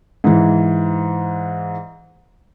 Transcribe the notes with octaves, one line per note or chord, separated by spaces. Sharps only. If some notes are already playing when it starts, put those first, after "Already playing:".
G#2 E3